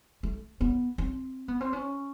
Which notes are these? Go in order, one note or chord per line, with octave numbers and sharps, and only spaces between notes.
A3
B3
C4
B3
C4
C#4